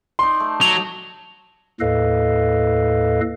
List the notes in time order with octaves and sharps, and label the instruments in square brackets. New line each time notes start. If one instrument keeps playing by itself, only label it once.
[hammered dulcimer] D#4 D5 [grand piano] C6
[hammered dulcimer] A3
[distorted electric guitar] F#3 [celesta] F7
[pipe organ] D#2 A2 A4 B4 D#5 F5